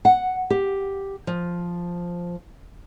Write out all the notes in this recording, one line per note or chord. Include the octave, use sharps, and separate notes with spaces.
F#5
G4
F3